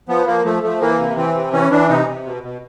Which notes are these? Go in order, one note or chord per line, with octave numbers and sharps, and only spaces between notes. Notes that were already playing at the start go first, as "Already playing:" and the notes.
F3 B3
F3 A#3
F3 A3
F3 A3
E3 A#3
C3
E3 C4
C3
E3 C#4
E3 D4
C3 D#4
C3
B2
B2